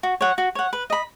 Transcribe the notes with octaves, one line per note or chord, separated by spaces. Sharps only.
F#4
C#5 F#5
F#4
C#5 F#5
B4
D#5 B5